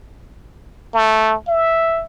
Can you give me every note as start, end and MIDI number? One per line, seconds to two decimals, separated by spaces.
0.94 1.35 57
1.48 2.03 76